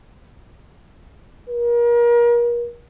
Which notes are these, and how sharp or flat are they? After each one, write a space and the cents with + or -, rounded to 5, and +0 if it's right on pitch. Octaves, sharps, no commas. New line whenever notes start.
A#4 +35